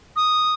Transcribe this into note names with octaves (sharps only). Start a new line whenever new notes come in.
D#6